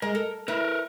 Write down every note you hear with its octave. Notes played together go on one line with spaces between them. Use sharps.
G#3 A#4
A4
E4 A#4 B4